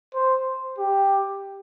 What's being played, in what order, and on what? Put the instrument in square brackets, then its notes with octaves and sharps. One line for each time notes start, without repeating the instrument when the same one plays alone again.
[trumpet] C5
G4